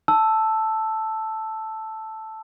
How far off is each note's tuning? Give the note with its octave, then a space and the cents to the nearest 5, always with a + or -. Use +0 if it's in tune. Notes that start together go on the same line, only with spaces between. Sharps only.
A5 +0 E6 +0